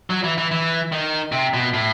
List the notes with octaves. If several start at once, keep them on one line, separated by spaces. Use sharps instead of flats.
F#3
E3
E3
E3
D#3
C3
B2
A2